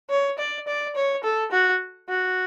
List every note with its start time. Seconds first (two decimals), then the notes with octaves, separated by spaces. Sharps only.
0.10 C#5
0.38 D5
0.67 D5
0.95 C#5
1.24 A4
1.51 F#4
2.09 F#4